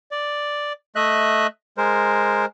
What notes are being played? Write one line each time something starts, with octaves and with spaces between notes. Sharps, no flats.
D5
A3 D#5 E5 F#6
G#3 A#4 C5